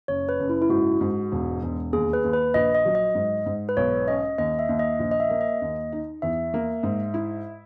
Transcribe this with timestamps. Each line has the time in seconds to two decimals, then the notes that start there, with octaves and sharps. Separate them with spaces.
0.08 F#1 C#5
0.29 B4
0.40 F#1
0.49 E4
0.62 E4
0.69 G#2 F#4
1.01 G#2
1.32 E1
1.63 E1
1.93 D#2 G#4
2.13 B4
2.24 D#2
2.33 B4
2.54 A#1 D#5
2.74 D#5
2.85 F#3
2.95 D#5
3.15 G#2
3.46 G#2
3.69 B4
3.77 B1 C#5
4.08 C#4 D#5
4.38 D#2 D#5
4.59 E5
4.69 D#2
4.79 D#5
4.99 A#1
5.11 D#5
5.20 E5
5.30 A#3
5.41 D#5
5.62 D#2
5.92 D#4
6.22 E2 E5
6.54 A#3
6.83 G#2
7.14 E4